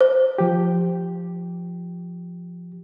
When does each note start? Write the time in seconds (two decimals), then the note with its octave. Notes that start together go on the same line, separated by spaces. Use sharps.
0.01 C5
0.38 F3 G4